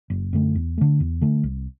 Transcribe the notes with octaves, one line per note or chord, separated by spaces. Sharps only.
F#1
F#2 D3 A3
E2
D3 A3
E2
D3 A3
C2